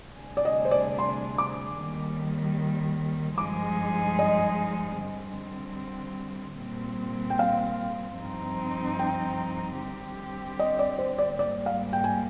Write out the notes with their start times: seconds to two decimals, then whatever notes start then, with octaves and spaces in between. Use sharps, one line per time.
0.18 D2 C3 G3 D4 G#4
0.37 D5
0.45 D#5
0.65 C5
0.71 D5
0.99 C6
1.38 D6
1.78 D#2 D#3 G3
3.38 G2 F3 G#3 D#4 G#4 D6
4.19 D#5
4.98 D3 G3 C4
6.59 A#2 G3 C4
7.30 G5
7.39 F5
8.18 G2 F3 C4 D#4
8.99 G5
9.78 D3 G3 C4 G4
10.59 D#5
10.79 D5
10.98 C5
11.18 D5
11.39 G#2 G3 A#3 D5
11.66 F5
11.93 G5
12.04 G#5